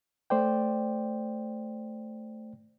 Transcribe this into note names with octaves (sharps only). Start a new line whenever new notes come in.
A3 C5 D5 G5